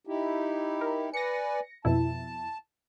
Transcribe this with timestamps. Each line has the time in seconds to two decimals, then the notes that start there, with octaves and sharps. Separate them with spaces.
0.07 D#4 E4 G4
0.81 A#4
1.14 B4 D5 G#5 A#6 C#7
1.85 F2 B2 E4 A5